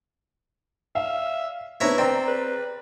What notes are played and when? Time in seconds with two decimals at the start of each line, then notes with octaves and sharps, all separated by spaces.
0.95 E5 F5
1.81 B3 C4 D4 E4 B4 C#5 A#5
1.98 C4 D5 A#5
2.28 B4